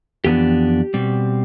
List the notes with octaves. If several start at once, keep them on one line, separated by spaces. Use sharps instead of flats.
F2 E3 B3 D4 G4
B2 G3 C4